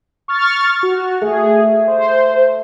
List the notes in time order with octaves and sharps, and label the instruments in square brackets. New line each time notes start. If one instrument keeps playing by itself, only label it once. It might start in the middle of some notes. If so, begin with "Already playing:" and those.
[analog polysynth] C#6 F6 A6
F#4
[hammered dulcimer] A3 [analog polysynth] G#4
[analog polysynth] C5